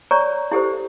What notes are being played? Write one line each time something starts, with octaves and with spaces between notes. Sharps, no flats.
C#5 D5 A#5 C#6
E4 G4 A4 C5